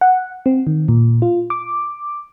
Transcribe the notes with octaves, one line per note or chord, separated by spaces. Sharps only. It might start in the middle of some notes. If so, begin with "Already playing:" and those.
F#5
C4
D#3
A#2
F4
D6